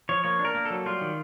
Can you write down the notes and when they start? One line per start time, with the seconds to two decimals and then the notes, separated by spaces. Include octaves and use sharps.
0.09 F3 C#5
0.24 A#3 C#5
0.39 D4
0.45 A#4
0.55 A#3
0.65 F#3 A4
0.85 G3 F4
1.01 D#3